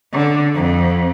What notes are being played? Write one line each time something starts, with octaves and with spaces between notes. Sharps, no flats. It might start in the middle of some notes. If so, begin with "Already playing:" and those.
D3
F2